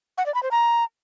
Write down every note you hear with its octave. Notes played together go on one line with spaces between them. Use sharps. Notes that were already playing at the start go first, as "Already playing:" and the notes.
F#5
D5
B5
C5
A#5